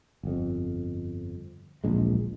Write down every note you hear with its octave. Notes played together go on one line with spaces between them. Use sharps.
G1 F2
D1 A#1 G#3